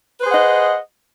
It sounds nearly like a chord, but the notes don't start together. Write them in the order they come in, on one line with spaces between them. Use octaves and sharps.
B4 C5 G#4 F#5 D#5